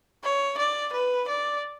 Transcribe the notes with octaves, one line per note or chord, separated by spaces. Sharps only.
C#5
D5
B4
D5